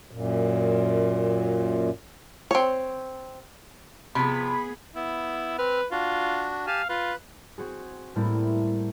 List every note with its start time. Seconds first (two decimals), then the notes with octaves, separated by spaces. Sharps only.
0.11 F#2 A#2
2.51 C4 C#5
4.15 C3 F3 B3 G#4 B5 B6
4.95 B3 E4
5.58 C4 B4 F6
5.91 D4 F4 F#4
6.67 G4 F5 G#5 A5
6.89 F4 B4
7.58 C4 F#4 G#4
8.16 A2 G3 A3 A#3 C4 E4